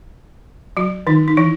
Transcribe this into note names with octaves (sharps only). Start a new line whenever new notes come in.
F#3 F#4
D#3 D#4
D#4
E3 E4